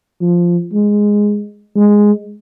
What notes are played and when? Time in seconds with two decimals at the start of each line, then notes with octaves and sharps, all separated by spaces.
0.21 F3
0.74 G#3
1.76 G#3